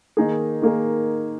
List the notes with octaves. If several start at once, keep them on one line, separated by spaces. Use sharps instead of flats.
D#3 A#3 D#4 G#4
D#3 A#3 D#4 G#4